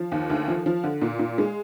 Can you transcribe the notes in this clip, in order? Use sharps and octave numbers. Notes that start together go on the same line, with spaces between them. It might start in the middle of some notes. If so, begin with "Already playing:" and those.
Already playing: F3
D#2
D2
F3
F3
D3
A#2
A#2
G#3